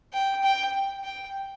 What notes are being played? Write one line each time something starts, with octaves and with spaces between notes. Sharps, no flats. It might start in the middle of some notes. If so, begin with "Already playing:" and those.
G5
G5
G5